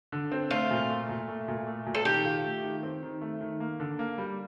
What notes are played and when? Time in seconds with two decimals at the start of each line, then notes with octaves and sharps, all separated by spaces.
0.12 D3
0.32 C4
0.51 A3 F4
0.71 A#2
0.90 A3
1.09 A#2
1.28 A3
1.48 A#2
1.67 A3
1.87 A#2
1.95 A4
2.05 D#3 G4
2.25 F4
2.44 A3
2.64 D#3
2.83 C4
3.03 D#3
3.22 A3
3.41 D#3
3.60 A#3
3.80 D3
3.99 A#3
4.18 G3